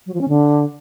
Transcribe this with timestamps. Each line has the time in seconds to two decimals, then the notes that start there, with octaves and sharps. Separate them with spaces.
0.06 F#3
0.14 F3
0.21 C#4
0.28 D3